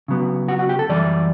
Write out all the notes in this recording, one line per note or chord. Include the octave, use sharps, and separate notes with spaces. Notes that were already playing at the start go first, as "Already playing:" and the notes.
C#3 F#3 B3
F#4
F#4
G4
A4
F#2 E3 G3 D5